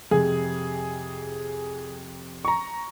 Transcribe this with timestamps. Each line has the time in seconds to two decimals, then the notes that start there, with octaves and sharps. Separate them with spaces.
0.11 F2 C3 G#4
2.45 A#5 C#6